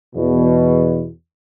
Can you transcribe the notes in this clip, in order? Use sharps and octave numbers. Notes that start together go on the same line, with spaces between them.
E2 B2